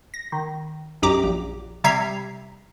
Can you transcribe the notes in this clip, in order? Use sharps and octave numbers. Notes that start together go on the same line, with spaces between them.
A#6
D#3
B1 F#2 G4 A#5 D6
A#1
C3 G3 E5 A#5 G#6 C7